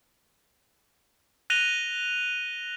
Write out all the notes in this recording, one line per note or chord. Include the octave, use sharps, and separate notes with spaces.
F#6 A#6 D#7 F7 G7